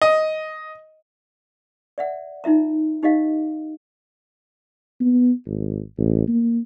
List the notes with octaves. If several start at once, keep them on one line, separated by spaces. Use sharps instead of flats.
D#5
D5 E5 F#5
D#4 F4 E5 A#5
D#4 G4 D#5 F5
B3
G#1
A1
A#3